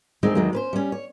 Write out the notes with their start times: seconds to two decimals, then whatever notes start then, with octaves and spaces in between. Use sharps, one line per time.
0.23 D2 D#3 G#3 C4
0.35 E2 D#3 F#3 G#3
0.53 C#4 B4 C5
0.73 G3 C#4
0.92 C#5